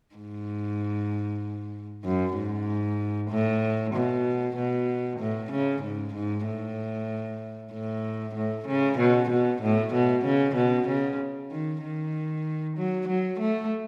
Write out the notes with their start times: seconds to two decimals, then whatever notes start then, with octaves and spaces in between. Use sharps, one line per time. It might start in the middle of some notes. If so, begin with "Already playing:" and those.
0.16 G#2
2.05 F#2
2.36 G#2
3.30 A2
3.94 B2
4.56 B2
5.20 A2
5.52 C#3
5.82 G#2
6.14 G#2
6.46 A2
7.72 A2
8.35 A2
8.67 C#3
8.98 B2
9.29 B2
9.62 A2
9.93 B2
10.25 C#3
10.55 B2
10.88 C#3
11.51 D#3
11.82 D#3
12.77 F#3
13.08 F#3
13.40 A3